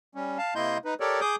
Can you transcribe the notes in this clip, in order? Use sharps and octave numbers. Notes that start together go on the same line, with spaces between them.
G3 C#4
F5 A5
C3 A#3 E4 D#5 C6 G6
D#4 B4
G4 A4 A#4 C#5 D5
G#4 D6 D#6 G6